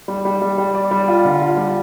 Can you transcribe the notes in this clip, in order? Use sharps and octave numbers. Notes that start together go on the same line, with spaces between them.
G3
G3
G3
G3
D5
G3
F4
D3
F4
G3